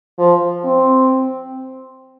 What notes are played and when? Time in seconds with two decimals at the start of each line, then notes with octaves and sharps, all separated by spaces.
0.19 F3
0.64 C4